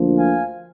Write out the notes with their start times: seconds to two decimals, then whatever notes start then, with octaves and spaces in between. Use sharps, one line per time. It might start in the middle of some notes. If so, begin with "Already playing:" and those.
Already playing: D2 D3 F3 A#3
0.17 F5 G#5